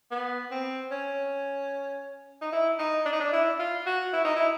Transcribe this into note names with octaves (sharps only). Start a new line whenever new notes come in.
B3
C4
C#4
D#4
E4
D#4
D4
D#4
D4
E4
F4
F#4
E4
D#4
E4